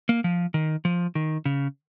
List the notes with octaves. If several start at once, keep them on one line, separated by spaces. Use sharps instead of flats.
A#3
F3
D#3
F3
D#3
C#3